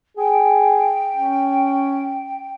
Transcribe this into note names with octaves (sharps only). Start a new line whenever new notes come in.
G#4 G5
C#4